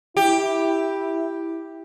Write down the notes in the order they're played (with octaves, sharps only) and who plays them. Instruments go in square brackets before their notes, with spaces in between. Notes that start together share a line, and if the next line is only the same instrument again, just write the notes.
[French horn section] E4 [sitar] G4